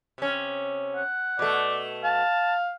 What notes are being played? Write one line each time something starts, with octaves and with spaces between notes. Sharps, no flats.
C3 C#4
F#5
B2 A3 D5
F5 A5